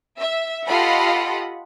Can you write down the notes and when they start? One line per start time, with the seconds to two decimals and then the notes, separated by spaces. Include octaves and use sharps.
0.17 E5
0.67 F4 G4 A4 D#5 F#5 B5